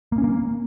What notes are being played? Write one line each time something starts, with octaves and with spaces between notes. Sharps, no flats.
A#3
C#4
A#3